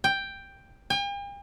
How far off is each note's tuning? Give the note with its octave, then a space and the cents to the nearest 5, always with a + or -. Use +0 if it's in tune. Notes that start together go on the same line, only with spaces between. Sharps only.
G5 +5
G5 +45